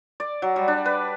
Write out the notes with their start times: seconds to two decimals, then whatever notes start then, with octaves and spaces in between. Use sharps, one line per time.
0.20 D5
0.42 F#3
0.56 G3
0.68 D4
0.86 B4